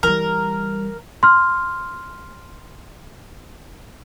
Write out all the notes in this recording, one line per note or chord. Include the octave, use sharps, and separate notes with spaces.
E3 G3 A#4
C6 F6